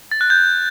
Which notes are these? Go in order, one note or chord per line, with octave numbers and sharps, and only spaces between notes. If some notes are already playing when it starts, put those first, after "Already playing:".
A6
F#6
G6